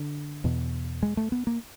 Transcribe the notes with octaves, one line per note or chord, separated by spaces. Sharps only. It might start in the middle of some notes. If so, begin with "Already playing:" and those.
Already playing: D3
E2 B2
G#3
A3
B3
A#3